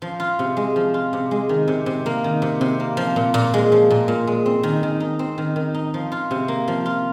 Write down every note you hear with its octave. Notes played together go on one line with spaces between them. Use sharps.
F3
F4
C3
G#3
F3
F4
C3
G#3
D#3
C3
C3
A#3
D#3
C3
C3
A#3
F3
A#2
A#2
G#3
F3
A#2
A#2
G#3
C4
D#3
D#3
D#4
C4
D#3
D#3
D#4
F3
F4
C3
A#3
F3
F4